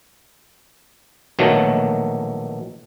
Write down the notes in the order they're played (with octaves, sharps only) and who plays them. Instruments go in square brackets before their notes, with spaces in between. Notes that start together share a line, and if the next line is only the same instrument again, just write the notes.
[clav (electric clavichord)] A#1 B2 D#3 F#3 A3